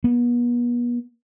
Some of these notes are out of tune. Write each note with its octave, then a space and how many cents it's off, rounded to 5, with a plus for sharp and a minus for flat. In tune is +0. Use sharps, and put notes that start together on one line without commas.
B3 -40